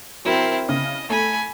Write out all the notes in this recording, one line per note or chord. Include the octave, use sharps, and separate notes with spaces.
F#3 C4 E4 A#4
C#3 D#5
A3 G#5 B5